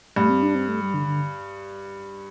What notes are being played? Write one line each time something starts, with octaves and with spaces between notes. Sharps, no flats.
G2 A3
C4
D4
C4
A3
G3
D3
D3